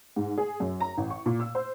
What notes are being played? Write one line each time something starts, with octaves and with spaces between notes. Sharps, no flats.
G#2
G#4
F#2
A#5
A1
C#6
A#2
E6
C5